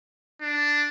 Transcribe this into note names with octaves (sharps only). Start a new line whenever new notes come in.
D4